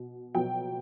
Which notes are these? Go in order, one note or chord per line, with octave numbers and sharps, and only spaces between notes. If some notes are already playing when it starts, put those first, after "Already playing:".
Already playing: B2
B2 F#3 B3 G5